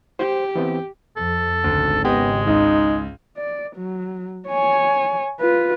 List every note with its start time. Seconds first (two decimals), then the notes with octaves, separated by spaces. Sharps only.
0.19 G4 C5
0.56 E3 B3 C4
1.17 F2 A4
1.64 G#1 D2 C#3
2.05 G#3 B3 G4 D#5
2.47 C#2 D#4
3.37 D5
3.76 F#3
4.48 C#5 G#5
5.40 F4 B4